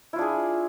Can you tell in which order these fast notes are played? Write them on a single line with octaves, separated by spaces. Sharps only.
E4 F4 D4 G#4